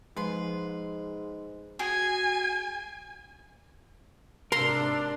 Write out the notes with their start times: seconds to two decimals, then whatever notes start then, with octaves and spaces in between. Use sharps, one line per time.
0.17 G#2 F3 G#3 B4 C6
1.79 F#4 G#4 G#5
4.52 G#2 C3 D4 A#4 A#5 C6 E6